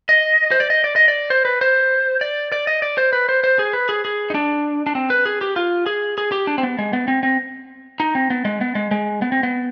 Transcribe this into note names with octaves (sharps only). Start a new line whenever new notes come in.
D#5
C5
D5
D#5
D5
D#5
D5
C5
B4
C5
D5
D5
D#5
D5
C5
B4
C5
C5
G#4
B4
G#4
G#4
D#4
D4
D4
C4
B4
G#4
G4
F4
G#4
G#4
G4
D4
C4
B3
G#3
B3
C4
C4
D#4
C4
B3
G#3
B3
G#3
G#3
B3
C4
B3